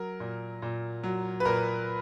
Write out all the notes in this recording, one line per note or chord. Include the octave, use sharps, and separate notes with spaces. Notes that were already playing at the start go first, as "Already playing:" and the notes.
Already playing: F#3 A#4
A#2
A#2
F#3
B4
A#2 A#4